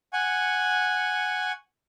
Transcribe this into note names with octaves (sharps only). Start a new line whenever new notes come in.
F#5 G#5 C#6